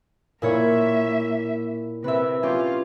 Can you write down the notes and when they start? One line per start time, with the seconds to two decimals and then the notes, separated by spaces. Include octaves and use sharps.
0.42 A#2 A#3 E4 C#5 E5
2.04 C3 B4 E5
2.43 C#4 F4 G4